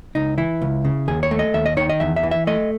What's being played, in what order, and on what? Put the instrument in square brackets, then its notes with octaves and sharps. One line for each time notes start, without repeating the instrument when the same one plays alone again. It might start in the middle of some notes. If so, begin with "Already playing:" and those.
[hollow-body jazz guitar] C#2 D#4
E3 E4
C#2
C#3
D#2 G#4
C#5
A3
D#5
D#2 E5
D#5
D#3 C#5
D#5
E2 E5
E5
E3
E5
A3 D#5